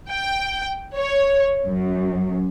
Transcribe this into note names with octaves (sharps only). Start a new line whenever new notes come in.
G5
C#5
F#2